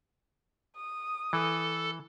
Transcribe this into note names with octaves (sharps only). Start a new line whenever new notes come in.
D#6
E3 A4